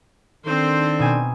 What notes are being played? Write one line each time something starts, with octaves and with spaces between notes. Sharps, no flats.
D#3 C4 D4 A4 C5
B2 D#4 G#5